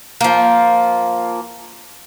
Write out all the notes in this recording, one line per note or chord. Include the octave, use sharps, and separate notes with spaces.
F3 A#3